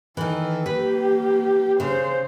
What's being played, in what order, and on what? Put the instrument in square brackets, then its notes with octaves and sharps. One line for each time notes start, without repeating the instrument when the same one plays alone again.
[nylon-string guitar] D#3 E3 [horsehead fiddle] A4
[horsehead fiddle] A#3 G4 [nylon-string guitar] B4
[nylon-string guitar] C#3 [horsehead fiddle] C5